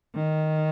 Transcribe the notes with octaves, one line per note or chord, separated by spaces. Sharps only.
D#3